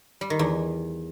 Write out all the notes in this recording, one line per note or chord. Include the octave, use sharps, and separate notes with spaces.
G3
D#3
E2